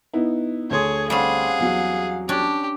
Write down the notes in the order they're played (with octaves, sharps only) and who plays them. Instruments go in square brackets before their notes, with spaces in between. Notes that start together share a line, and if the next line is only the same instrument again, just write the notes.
[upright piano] B3 D#4 E4
[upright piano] D2 A4 C6 [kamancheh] G#4 C#5
[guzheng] G3 C4 C#4 [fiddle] G#4 [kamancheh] F5 F#5
[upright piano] E2 F#3
[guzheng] C#4 D4 [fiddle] G4